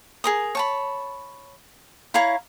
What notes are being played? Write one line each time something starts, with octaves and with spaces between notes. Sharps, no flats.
G#4 A#4 D#6
C#5 A5 B5
E4 C#5 F5 A#5